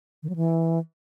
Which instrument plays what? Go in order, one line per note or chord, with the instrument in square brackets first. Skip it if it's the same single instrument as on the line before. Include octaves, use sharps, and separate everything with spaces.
[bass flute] D#3
F#3
E3